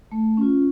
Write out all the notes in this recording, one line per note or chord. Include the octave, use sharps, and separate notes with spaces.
A3
C#4 F4